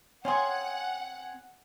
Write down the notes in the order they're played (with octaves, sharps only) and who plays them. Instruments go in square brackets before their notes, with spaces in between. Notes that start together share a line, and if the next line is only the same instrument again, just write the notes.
[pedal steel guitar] C4 F5 G#5 [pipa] C#4 G#4 [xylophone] C#5 C6 [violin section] F#5